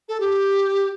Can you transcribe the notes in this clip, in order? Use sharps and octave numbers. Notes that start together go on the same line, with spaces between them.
A4
G4